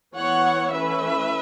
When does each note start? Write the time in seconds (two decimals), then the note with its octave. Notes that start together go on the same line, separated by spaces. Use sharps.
0.15 E3 B3 C#5 F#5
0.73 E3 A3 C#4 B4 E5